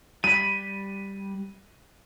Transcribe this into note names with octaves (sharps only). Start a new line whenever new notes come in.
G3 B5 D#7